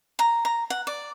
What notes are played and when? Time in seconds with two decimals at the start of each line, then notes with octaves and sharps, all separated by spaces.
0.19 A#5
0.45 A#5
0.70 F#5
0.87 D5